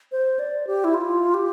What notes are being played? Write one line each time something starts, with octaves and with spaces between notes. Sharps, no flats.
C5
D5
G4
E4
F4
G4